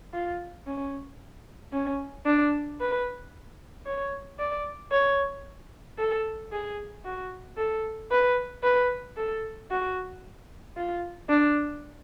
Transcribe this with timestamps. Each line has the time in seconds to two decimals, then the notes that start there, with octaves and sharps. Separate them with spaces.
0.14 F4
0.67 C#4
1.73 C#4
2.26 D4
2.80 B4
3.86 C#5
4.39 D5
4.91 C#5
5.98 A4
6.52 G#4
7.05 F#4
7.57 A4
8.11 B4
8.63 B4
9.16 A4
9.70 F#4
10.77 F4
11.29 D4